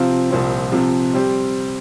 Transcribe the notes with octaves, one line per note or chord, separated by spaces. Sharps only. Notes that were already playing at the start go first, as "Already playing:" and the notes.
Already playing: C3 F3 C4 F4
C2 A#2 F3 C4
C3 F3 C4
G3 C4 G4